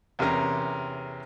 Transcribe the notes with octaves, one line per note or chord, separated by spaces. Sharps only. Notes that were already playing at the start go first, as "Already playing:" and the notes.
E2 C3 C#4 A#4 A#5